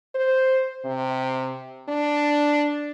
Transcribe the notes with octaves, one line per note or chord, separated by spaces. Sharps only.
C5
C3
D4